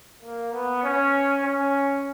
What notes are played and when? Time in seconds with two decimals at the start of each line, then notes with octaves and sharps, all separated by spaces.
0.23 A#3
0.53 B3
0.83 C#4
1.43 C#4